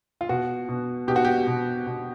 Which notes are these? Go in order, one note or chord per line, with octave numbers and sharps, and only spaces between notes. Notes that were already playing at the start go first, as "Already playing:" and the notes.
F4
B2 F#4
B2
B2 G4
F#4
G4
B2
B2